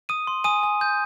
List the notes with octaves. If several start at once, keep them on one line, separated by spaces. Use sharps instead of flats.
D#6 D#7
C6
G#5 D#6 D#7
G#5
G6